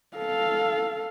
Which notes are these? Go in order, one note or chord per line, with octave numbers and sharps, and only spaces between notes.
A4 F5